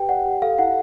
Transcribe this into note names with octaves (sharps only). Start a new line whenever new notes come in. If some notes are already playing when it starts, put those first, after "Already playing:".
Already playing: G4 B4 G5
D5 F#5
G4
A4 F5
E4 F#5